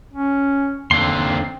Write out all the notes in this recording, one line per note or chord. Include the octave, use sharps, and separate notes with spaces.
C#4
D#2 D3 C4 C6